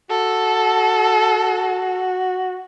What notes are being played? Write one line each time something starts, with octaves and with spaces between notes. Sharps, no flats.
F#4 A4